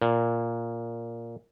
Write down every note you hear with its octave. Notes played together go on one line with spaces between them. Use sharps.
A#2